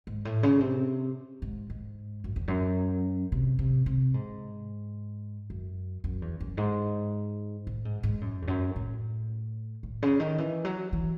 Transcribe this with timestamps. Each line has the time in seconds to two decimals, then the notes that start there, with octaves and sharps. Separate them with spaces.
0.07 G#2
0.25 A2
0.43 C#3
0.60 C3
1.42 G#2
1.70 G#2
2.24 F#2
2.36 E2
2.48 F#2
3.32 C3
3.59 C3
3.86 C3
4.14 G#2
5.50 F#2
6.04 F#2
6.22 E2
6.40 F#2
6.57 G#2
7.67 A2
7.85 G#2
8.03 G#2
8.21 F#2
8.42 E2
8.48 F#2
8.76 A2
9.83 A2
10.02 C#3
10.20 D#3
10.38 E3
10.65 F#3
10.93 E3